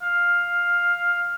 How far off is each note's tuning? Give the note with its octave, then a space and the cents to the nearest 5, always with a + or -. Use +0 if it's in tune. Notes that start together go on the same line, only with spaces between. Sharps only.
F5 +5